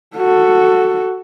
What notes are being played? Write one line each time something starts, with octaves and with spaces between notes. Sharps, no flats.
F#4 A4